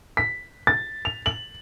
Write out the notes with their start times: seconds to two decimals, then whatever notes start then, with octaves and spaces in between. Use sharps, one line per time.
0.17 B6
0.67 A6
1.05 F7
1.26 F#7